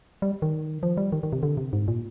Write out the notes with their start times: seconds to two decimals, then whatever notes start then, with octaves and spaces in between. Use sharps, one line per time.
0.22 G3
0.42 D#3
0.83 F3
0.97 G3
1.12 D#3
1.23 D#3
1.33 C3
1.43 D3
1.57 C3
1.73 G#2
1.88 A#2